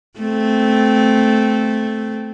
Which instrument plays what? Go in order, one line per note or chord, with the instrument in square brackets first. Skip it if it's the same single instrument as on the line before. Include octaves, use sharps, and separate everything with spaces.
[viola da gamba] A3 C4